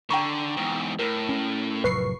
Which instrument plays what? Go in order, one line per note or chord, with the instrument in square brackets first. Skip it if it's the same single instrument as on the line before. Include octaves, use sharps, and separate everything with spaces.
[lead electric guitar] D3 [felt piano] G5 A#5 C#6
[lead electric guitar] E2 G#2
[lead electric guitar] A2 [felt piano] A#4
[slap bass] C#4
[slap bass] F1 A2 F#3 [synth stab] B4 C#6 C7